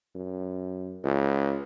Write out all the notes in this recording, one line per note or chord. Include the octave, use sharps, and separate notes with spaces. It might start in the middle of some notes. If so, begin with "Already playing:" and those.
F#2
C#2